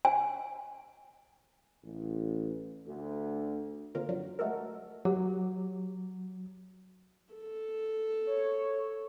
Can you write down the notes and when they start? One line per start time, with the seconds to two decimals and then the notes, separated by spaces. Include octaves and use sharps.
0.05 G#5
1.84 A1
2.87 D2
3.95 D3 A#3 C4 F4 A#4
4.09 F#2 D3 F3 F#3
4.39 G#3 A3 F#4 A4 A#4
5.05 F#3 G4
7.34 A4
8.27 C#5